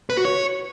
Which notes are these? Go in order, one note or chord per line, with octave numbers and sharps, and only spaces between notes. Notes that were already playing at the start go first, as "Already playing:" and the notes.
B4
F#4
C#5